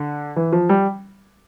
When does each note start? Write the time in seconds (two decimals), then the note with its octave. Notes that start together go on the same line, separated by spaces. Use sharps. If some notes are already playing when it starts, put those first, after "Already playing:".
Already playing: D3
0.36 E3
0.52 F3
0.69 G3